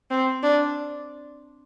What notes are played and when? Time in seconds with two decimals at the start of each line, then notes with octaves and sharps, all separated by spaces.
0.11 C4
0.43 D4